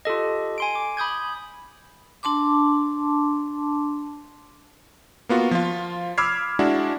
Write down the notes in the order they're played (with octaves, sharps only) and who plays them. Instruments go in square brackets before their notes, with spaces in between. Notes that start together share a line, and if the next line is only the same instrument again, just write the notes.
[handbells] F4 G4 A4 D#5
G#5 C6 D7
D6
B5 D#6 G6 G#6
[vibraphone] D4 A5 C6 D6
[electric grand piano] A#3 B3 F4 F#4
F3 F4
B5 D6 E6 F6 G#6 C7
G#3 D4 E4 F#4